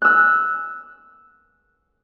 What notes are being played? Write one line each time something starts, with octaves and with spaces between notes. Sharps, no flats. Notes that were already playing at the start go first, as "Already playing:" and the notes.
E6 F#6